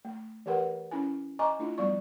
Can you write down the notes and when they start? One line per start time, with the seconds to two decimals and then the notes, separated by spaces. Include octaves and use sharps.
0.05 A3
0.46 E3 G4 A#4 B4 F#5
0.91 C#4 E4 G#5
1.39 D#5 G#5 A#5 C#6 D6
1.59 A3 D4 E4 F4
1.78 F3 G3 B3 D5 C#6